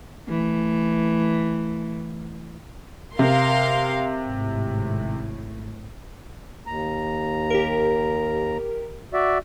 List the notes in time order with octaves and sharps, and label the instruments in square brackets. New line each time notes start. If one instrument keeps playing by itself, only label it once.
[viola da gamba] E3 A3
[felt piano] C3 [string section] A#4 F5 C6
[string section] G#1 A2
[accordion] D#2 A#5
[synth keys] G4 A#4
[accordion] F#4 D5 E5